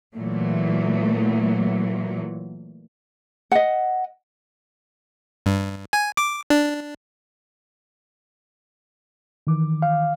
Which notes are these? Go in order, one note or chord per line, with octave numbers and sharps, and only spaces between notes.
A#2 E3 F#3 A3
D#5 F#5
G2
G#5
D6
D4
D#3 E3 D6
F5